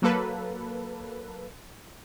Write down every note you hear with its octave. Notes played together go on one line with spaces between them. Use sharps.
F#3 A#3 A4 B4